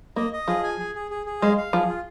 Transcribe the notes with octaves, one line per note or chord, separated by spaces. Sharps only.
A#3 D#5
D#5
F3 G#4
G#5
G#4
G#4
G#4
G#4
G#3 F5
F5
F3 G#4
F4